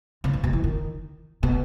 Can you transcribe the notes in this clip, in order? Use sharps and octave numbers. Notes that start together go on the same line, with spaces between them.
C3
B2
B2
E3
D#3
B2